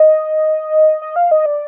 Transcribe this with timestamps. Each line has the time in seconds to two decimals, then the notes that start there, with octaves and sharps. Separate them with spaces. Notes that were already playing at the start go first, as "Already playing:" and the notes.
Already playing: D#5
1.02 D#5
1.16 F5
1.31 D#5
1.46 D5